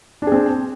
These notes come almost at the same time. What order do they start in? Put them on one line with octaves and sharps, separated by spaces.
D4 G#4 C4